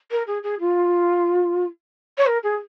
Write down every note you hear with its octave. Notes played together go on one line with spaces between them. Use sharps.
A#4
G#4
G#4
F4
C#5
A#4
G#4